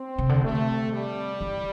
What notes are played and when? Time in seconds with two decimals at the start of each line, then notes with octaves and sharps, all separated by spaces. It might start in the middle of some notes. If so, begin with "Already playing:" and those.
Already playing: C4
0.18 C3
0.29 D3
0.41 C3 A3
0.91 G3
1.41 E3